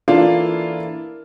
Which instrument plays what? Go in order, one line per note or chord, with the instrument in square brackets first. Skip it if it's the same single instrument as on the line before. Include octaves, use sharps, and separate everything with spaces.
[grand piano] E3 A#3 E4 A4 D5 [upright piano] D4 F4